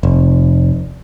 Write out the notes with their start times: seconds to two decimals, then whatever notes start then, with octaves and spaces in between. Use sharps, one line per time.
0.03 F1